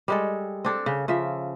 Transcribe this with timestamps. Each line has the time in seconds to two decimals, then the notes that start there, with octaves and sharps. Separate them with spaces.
0.08 G3 G#3 A4
0.65 C4 D4 A4
0.86 C#3
1.08 C#3 F3 E5